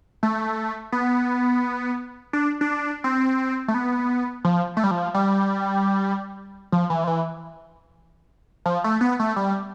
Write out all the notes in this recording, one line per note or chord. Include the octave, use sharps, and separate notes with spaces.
A3
B3
D4
D4
C4
A3
B3
F3
A3
G3
F3
G3
F3
E3
F3
E3
F3
A3
B3
A3
G3